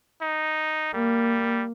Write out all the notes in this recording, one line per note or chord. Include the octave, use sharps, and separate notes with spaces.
D#4
G3 A#3